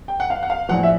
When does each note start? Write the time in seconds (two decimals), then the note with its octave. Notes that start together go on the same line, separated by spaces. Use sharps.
0.08 G5
0.20 F#5
0.30 F5
0.43 F#5
0.50 F5
0.69 A#1 A2 F3 F#5
0.83 E5